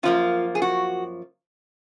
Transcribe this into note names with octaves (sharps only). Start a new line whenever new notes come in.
F#2 F3 A#3 F4
G#4
F#4